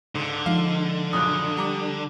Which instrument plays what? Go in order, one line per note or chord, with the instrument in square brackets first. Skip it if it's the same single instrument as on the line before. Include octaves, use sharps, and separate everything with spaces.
[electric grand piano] C#2 G#2 [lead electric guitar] D3
[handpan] F3 G#3 D#4 [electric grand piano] F5
[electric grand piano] F#2 A#2 C#3 [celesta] D#6 F#6
[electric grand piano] G3 A#5 D6